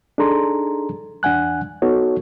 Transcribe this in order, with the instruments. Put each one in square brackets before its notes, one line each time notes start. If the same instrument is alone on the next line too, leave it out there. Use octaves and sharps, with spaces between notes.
[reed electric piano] D4 D#4 G#4 A4 A#5 C6
E2 D4 F#5 G#5 F#6
B3 D#4 F#4 A4 C#5